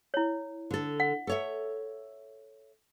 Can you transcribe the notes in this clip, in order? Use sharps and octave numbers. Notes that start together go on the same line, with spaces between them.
E4 C#5
D3 A4
F#5
A4 C#5 E5